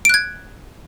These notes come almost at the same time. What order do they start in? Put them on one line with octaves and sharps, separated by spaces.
D7 F#6 G#6